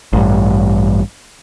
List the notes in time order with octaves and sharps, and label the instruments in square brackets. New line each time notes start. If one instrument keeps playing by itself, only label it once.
[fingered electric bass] A1 G2